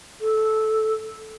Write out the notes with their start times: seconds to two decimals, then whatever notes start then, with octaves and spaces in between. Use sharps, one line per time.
0.21 A4